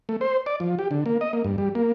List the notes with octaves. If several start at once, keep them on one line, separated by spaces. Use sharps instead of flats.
A3
C5
D5
F3
G4
D3
A#3
D#5
A#3
G2
G3
A#3